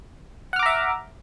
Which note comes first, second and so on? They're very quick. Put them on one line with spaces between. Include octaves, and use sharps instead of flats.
F#5 F6 D6 A#5 E5